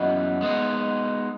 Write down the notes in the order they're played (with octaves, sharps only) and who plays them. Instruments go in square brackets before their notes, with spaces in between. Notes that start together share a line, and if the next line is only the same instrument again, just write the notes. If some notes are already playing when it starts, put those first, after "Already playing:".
Already playing: [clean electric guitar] F#2 E3 B3 F#4 [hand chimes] D#5 F#5
[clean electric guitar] G#3 B3 D#4